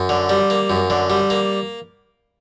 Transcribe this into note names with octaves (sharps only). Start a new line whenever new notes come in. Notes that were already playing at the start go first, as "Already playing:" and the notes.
Already playing: F#2
D3
G3
A#3
F#2
D3
G3
A#3